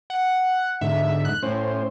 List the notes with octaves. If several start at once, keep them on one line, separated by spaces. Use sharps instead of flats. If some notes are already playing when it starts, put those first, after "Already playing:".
F#5
G#2 D3 E5
F#6
A2 C#4 C5